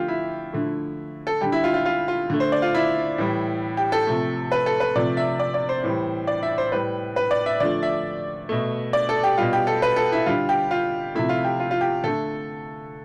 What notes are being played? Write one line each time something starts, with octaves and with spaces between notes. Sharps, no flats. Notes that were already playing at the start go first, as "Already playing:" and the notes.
Already playing: D3 F3 A3 F4 G4
E4
D3 F3 A3
A4
D3 G3 G4
E4
F4
F4
F4
F4
D3 A3
C5
D5
F4
E4
A2 E3 G3
G4
A4
C3 F3 A3
B4
A4
B4
C3 F3 A3 D5
E5
D5
D5
C5
A2 E3 G3
D5
E5
C5
A2 G3 B4
B4
D5
E5
D3 F3 A3 D5
E5
B2 A3
D5
A4
G4
B2 G3 F4
G4
A4
B4
A4
E4
D3 G3 F4
G4
F4
C3 F3 A3 E4
F4
G4
F4
F4
G4
D3 A3 A4